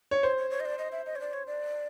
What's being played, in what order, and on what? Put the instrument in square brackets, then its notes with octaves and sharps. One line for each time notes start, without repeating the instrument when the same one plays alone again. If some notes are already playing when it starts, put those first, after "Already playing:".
[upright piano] C#5
[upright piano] C5 [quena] C#5
[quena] C#5
C#5
D#5
D5
D#5
E5
D#5
C#5
D5
C#5
D5